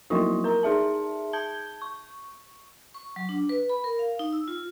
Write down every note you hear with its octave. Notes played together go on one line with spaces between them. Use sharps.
F3 F#3 A#3 D#4 E4 F#4
A#4 A#5
D#4 G#4 E5 A5
A5 G6 G#6 G7
C#6
C#6
F#3
D4
B4
B5
A#4
F5
D#4
E6
F4